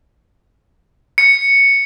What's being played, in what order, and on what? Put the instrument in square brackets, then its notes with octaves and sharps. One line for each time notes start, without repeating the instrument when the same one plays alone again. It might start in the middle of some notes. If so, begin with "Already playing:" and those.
[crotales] C#7